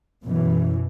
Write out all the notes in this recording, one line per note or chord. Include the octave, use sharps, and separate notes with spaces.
F#2 B2 E3